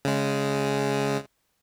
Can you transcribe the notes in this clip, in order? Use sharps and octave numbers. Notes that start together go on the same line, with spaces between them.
C#3 G#3